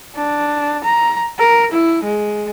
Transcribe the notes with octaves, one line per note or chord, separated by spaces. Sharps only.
D4
A#5
A#4
E4
G#3